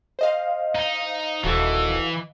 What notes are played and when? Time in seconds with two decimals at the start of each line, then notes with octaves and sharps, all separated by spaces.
0.19 C5 D#5 F5
0.76 D#4
1.44 D#1 E3 F#4 A4